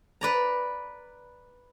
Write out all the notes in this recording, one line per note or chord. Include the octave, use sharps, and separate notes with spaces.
B4 D5 A#5